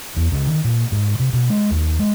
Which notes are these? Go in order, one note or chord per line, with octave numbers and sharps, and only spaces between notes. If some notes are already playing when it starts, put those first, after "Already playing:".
E2
C#2
D#3
A#2
G#2
C3
B2
G#3
D#2
G#3